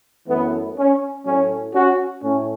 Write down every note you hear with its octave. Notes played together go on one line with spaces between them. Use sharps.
F#2 E3 A3 B3
C#4
A2 F#3 A3 C#4
C#4 F#4
A2 A3 C#4